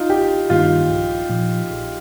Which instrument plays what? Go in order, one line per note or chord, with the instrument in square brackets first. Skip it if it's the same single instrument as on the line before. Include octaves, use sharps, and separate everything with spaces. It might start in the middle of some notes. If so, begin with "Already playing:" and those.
Already playing: [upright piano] D#4 F4
[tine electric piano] G#1 [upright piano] G4
[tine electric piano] G2 D#3 A#3 D#4 [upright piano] F4
[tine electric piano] A#1
A#2 F3
A#1